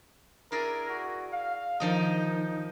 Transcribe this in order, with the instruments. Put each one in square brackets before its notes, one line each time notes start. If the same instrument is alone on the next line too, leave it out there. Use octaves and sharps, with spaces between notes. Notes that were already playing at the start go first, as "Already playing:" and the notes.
[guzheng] E4 G#4 D5 [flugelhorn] A#4
[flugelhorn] F#4
F5
[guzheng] D#3 F3 D#5 [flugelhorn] D#4